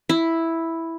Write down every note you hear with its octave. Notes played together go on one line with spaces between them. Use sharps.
E4